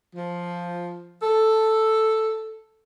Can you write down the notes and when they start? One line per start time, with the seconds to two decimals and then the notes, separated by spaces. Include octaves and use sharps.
0.15 F3
1.22 A4